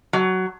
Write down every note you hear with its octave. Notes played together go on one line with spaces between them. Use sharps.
F#3